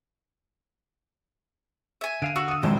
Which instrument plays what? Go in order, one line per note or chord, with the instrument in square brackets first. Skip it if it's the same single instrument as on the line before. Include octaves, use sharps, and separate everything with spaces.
[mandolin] E5 G#5
[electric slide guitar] D3 F5 [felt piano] D7 D#7
[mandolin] F#4 [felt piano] E6
[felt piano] D#6 D#7
[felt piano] F1 A#1 F2 [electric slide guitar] D#3 F#3 [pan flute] G#3 [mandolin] C5